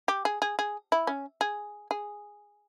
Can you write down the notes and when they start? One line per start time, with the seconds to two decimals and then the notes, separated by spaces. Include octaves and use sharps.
0.08 G4
0.25 G#4
0.42 G#4
0.59 G#4
0.92 E4
1.07 C#4
1.41 G#4
1.91 G#4